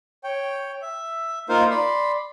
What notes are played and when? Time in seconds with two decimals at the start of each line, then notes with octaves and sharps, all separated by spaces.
0.24 C#5 G5
0.82 E5
1.49 A#3 D#4 F4 A#4 C5 F5
1.70 D5 B5 C6